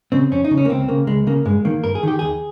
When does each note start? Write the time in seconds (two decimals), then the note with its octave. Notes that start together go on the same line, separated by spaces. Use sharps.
0.12 C#3 C4
0.31 F2 C#4
0.45 D#4
0.51 C#3
0.57 C#4
0.65 A#3
0.69 C#2 C4
0.88 C#3 A#3
1.07 C#2 G#3
1.27 C#3 A#3
1.45 G2 G#3
1.65 D#3 A#3
1.84 G2 A#4
1.95 G#4
2.03 D#3 G4
2.19 D#2 G#4